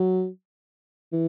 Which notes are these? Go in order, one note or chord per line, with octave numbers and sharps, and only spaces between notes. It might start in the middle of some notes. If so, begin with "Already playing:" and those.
Already playing: F#3
E3